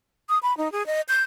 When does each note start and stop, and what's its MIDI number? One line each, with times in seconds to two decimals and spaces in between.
0.29 0.38 87
0.43 0.56 83
0.57 0.71 63
0.72 0.86 68
0.86 1.01 75
1.09 1.23 91